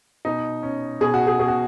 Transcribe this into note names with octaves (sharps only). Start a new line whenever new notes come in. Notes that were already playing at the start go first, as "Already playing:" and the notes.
B2 D#4
C#4
B2 G#4
F#4
G#4
B2 G#4
F#4